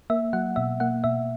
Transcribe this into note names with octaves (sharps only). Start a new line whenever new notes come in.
A#3 E5
F#3 F#5
B2 E5
A#3 F#5
B2 E5